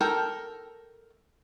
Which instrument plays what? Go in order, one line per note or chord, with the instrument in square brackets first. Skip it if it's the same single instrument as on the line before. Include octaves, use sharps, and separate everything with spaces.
[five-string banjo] A4 A#4 G5